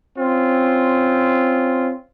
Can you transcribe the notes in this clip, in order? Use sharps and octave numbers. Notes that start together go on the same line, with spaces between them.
C4 C#4 F4